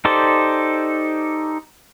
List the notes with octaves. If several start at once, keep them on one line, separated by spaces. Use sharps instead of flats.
D#4 G4 A4 C5 D5